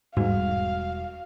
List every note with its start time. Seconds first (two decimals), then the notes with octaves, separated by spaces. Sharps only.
0.17 E1 G#2 G3 G#3 F#4 F5